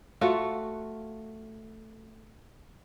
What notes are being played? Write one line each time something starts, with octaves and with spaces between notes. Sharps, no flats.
A3 F4 F#4